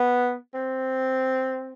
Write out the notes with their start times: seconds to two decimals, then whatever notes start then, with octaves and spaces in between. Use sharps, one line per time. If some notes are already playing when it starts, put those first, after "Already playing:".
Already playing: B3
0.54 C4